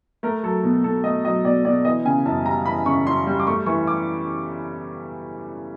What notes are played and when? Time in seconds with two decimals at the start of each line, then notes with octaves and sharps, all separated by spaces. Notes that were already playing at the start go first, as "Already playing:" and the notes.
0.23 A3 A#4
0.43 F#3 A4
0.63 B2
0.84 B2 A4
1.04 A3 D#5
1.25 F#3 D#5
1.45 B2 D5
1.65 B2 D5
1.85 E3 D#5
2.05 C#3 G#5
2.26 F#2 A5
2.45 G3 A#5
2.65 E3 B5
2.86 C#3 C#6
3.07 F#2 C6
3.27 G3
3.40 D6
3.47 A3 C#6
3.66 E3 C#6
3.87 D6